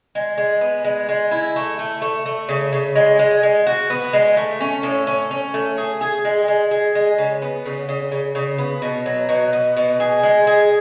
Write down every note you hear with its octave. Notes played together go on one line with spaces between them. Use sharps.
G#3
G#3
B3
G#3
G#3
E4
A3
A3
A3
A3
C#3
C#3
G#3
G#3
G#3
F#4
B3
G#3
A3
C#4
A2
C#4
C#4
A3
G#4
G#4
G#3
G#3
G#4
G#3
C#3
B3
C#3
C#3
C#3
C#3
B3
B2
F#3
B2
B3
B2
G#4
G#3
G#4